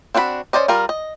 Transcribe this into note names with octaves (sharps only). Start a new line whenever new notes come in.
C4 D4 F#4 E5 B5
C#4 F4 C5 D5 D#5
G3 F4 A#4
D#5